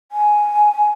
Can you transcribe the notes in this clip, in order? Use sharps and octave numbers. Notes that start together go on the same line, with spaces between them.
G#5